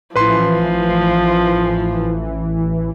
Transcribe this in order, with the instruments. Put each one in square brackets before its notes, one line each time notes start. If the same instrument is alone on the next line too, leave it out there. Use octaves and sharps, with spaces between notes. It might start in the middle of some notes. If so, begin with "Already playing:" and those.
[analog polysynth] A1 E3 [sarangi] F3 [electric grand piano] B4 C6